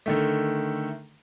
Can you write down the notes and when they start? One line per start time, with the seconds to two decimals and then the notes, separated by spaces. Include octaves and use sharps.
0.06 D3 D#3 A3